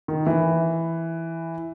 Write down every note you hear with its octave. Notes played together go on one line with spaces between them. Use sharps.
D#3
E3